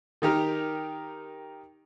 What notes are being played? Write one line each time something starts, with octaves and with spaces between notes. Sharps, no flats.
D#3 D#4 G4 A#4